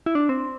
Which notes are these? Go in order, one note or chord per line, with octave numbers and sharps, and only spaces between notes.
E4
D4
C4